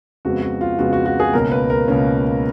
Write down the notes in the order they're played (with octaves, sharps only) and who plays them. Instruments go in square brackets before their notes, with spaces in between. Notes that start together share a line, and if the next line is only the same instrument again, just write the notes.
[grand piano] F2 C#3 G#3 B3 F#4
F#4
F4
F2 C#3 G#3 B3 F#4
F#4
F#4
G#4
C#2 B2 A#3 C#4 A#4
B4
A#4
C#2 B2 A#3 C#4